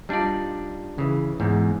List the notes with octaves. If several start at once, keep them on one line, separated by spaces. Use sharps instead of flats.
G3 D4 D#4 F4 D5
C#3 E3
E2 G#2